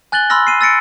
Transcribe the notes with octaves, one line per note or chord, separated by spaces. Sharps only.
G#5 F#6 A6 F#7 G7
B5 C6 E6 F6 A#6
C7 D#7
E6 A6 A#6 C#7 D7